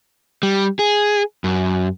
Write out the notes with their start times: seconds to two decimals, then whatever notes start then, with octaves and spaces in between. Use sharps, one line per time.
0.43 G3
0.79 G#4
1.44 F#2